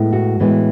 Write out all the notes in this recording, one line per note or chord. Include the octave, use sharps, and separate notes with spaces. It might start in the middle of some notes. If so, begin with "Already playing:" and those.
Already playing: A2 G#3 B3
F#4
A2 E3 G#3 B3